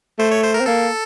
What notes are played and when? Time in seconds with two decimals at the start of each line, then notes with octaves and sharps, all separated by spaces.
0.19 A3 C5
0.31 C#5
0.43 C5
0.54 A#4
0.60 C4
0.66 A#3 A4